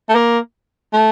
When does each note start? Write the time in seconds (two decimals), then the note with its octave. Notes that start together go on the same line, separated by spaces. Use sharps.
0.09 A3
0.15 A#3
0.93 A3